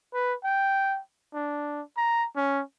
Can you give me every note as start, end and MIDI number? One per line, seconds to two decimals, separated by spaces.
0.14 0.34 71
0.44 0.99 79
1.34 1.82 62
1.97 2.26 82
2.36 2.62 61